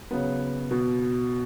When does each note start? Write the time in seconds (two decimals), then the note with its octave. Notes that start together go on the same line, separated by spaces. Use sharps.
0.11 C#3 F#3 B3
0.71 B2